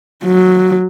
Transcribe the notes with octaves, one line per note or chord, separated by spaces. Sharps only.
F#3